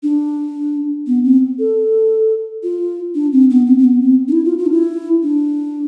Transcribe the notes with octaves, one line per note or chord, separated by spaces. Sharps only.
D4
B3
C4
A4
F4
D4
C4
B3
C4
C4
B3
C4
D4
E4
F4
F4
D4
E4
D4